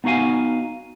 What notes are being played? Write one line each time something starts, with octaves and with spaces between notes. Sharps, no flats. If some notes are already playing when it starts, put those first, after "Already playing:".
B3 D#4 F#4 F5 G#5